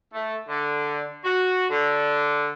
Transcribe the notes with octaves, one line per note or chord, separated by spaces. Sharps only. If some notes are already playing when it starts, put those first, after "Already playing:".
A3
D3
F#4
D3